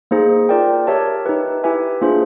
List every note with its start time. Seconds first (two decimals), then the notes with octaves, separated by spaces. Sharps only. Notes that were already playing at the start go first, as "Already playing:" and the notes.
0.11 A#3 D#4 G#4 C5
0.49 F4 A#4 D5 G5
0.87 G4 A#4 C#5 E5 A5
1.26 D#4 G4 B4
1.64 E4 G4 B4 E5 G#5
2.01 A#3 D4 F4 G#4 C5